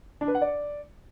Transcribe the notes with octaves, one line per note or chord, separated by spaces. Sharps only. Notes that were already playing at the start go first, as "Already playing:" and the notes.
D4
B4
F#5
D5